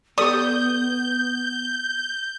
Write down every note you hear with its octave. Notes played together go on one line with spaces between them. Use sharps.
B3 G4 A4 D5 D#6 G6